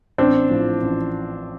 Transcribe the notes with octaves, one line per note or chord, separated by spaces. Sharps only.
A1 C4 D4
A2 F3
A1